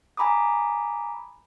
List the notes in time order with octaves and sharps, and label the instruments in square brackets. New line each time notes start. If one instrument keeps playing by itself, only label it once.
[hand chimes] G#5 A#5 B5 D6 D#6